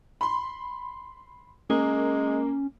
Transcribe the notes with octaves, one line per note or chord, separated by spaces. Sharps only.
B5 C6
G#3 A#3 C#4